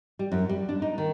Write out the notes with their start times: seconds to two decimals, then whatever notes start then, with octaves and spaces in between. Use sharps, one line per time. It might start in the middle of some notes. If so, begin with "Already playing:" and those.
0.19 G3
0.32 F#2
0.49 G3
0.69 D4
0.82 D#4
0.98 D#3